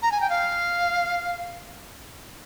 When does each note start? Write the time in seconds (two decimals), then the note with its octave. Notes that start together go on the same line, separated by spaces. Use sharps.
0.02 A#5
0.12 G#5
0.21 G5
0.30 F5